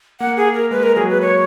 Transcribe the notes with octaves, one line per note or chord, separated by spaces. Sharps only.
A#3 F#5
G#4
A#4
G#3 B4
A#4
F#3 G#4
B4
C#5